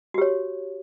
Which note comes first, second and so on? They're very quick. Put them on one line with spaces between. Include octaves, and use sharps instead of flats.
F#4 G4 C#5